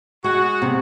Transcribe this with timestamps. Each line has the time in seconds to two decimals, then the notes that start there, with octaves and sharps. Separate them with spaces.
0.24 G#3 F#4
0.62 C3